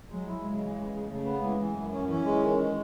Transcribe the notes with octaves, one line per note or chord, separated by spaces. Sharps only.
F#3 G#3
E4
C#3 G#3
E3
C#3
C#3
C#3 A3
B3
E3 G#3
E3
F#2 F#3
C#4
E3 C#4
G#3
D#3
G#3